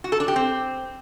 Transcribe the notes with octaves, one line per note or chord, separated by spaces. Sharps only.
F#4
A4
D4
G4
C4